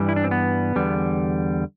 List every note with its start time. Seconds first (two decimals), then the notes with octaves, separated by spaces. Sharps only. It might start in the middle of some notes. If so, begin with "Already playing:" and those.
Already playing: G2 E3 G3
0.09 E4
0.16 D4
0.24 C4
0.31 B3
0.76 E2 D3 G3